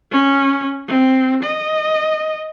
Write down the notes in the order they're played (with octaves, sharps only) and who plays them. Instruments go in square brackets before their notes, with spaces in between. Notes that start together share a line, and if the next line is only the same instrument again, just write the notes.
[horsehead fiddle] C#4
C4
D#5